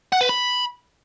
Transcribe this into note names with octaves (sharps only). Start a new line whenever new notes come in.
F#5
B4
B5